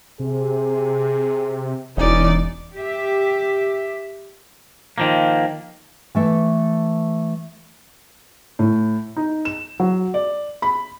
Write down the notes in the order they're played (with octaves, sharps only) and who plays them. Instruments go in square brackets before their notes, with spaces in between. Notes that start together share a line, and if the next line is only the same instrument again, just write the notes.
[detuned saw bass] C3 [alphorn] G#4
[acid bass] E1 [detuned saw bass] E3 [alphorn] C#4 [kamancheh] D#4 D5
[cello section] G4 E5
[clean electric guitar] D#3 F3 A#3
[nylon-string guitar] E3 A3 E5
[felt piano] A2
D#4
E7
F#3
D5
B5